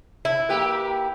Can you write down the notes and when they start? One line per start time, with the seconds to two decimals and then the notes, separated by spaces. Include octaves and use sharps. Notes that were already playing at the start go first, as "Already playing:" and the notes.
0.25 E4
0.49 A#3 G4 B4